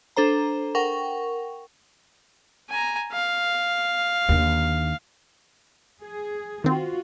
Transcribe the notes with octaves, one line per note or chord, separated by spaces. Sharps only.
D4 A4 C5 A#5
A#4 F#5 G5 C#6
G#5 A#5
F5
D#2 D3
G#4
D#3 C4 F4 F#4